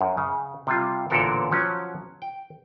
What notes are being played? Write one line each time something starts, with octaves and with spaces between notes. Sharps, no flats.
F#2
C#3
C3 G3 F4
A1 A#2 D3 B3 A4 A#4
F3 F#3 C#4
G5